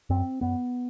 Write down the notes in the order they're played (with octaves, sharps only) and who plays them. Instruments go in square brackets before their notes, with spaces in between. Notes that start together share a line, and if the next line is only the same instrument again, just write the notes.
[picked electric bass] F#2 C4
F#2 B3